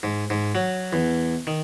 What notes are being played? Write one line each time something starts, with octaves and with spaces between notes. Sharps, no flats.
G#2
G#2
F#3
E2
D#3